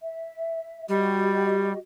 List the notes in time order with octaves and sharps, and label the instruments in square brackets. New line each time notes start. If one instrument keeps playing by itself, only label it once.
[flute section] E5
[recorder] G3 [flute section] F#4 G4 D#5